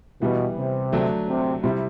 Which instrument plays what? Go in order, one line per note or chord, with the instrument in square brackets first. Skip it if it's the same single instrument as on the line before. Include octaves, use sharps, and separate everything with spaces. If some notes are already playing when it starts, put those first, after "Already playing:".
[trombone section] B2 [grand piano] E3 G3 B3
[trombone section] C3
[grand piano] D3 F#3 A3 D4
[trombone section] C3
[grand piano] C3 G3 C4 E4